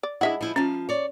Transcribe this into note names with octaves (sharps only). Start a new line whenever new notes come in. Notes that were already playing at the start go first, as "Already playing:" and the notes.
D5
G#3 D4 E4 E5 F#5
F3 E4
F3 C#4 F5
C#5 D5